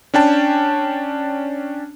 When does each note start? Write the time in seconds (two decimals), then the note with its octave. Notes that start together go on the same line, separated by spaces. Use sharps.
0.14 C#4 D4 G5 A5